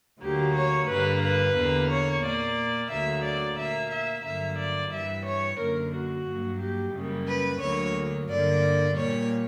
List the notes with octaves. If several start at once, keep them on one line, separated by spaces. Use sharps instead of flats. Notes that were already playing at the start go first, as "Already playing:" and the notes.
D2 D3 F#3 A#3 G4
C#5
G2 D3 G3 A#3 B4
B4
E2 D3 A#3
C#5
A#2 A#3 D5
D2 D3 F#3 A#3 E5
D5
A#2 A#3 E5
E5
G2 D3 F#3 A#3 E5
D5
G2 E3 G3 E5
C#5
F#2 D3 A#3 A#4
F#4
G2 F#3 A#3
G4
F#2 C#3 G3 A#3
B4
D2 D3 F#3 A#3 C#5
G2 D3 A#3 D5
A#2 G3 A#3 C#5